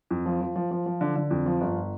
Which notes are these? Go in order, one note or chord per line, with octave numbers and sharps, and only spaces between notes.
F2
F3
F3
F3
F3
F3
D3
D3
F2
F3
G1